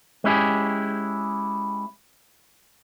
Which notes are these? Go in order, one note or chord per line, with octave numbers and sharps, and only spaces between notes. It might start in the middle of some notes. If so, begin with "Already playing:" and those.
G#3 C#4 E4 G4 G#4